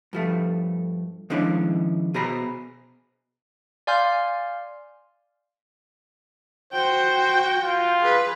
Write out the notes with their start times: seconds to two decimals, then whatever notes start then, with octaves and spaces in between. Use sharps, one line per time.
0.13 G2 F3 A3
1.30 D#3 F3 G#3 C#4 D4 E4
2.14 B2 G#4 C5 A#5 B5
3.87 D5 F5 G#5 C6 F6 G6
6.73 F#4 C5 G5
7.60 F4
8.01 G#4 B4